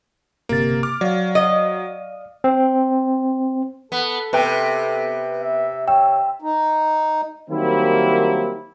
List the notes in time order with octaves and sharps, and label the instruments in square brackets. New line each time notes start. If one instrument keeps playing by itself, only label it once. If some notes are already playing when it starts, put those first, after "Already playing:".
[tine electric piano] G1 C3 A6 [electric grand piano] A#3
[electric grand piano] D6 F6
[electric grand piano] F#3 [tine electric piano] D5 F5
[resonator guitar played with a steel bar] D#5
[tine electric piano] C4
[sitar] B3 [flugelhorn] A4
[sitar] C3 [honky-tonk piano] B3 B4 G5
[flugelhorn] E5
[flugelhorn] C#5 [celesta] G5 [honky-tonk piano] E6
[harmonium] D#4
[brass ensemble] D#3 F#3 G3 A#3 C4 E4